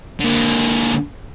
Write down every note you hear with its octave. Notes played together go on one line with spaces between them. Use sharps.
D3 A#3